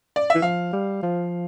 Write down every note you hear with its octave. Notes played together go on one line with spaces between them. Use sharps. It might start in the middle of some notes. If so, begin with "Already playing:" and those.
D5
E5
E3
F3 F5
G3
F3